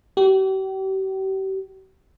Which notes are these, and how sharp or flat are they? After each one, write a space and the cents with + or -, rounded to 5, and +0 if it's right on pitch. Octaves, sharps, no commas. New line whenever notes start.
G4 -40